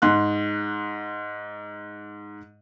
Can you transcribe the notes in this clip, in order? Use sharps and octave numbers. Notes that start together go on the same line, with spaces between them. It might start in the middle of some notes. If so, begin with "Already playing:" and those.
G#2 C6 F#6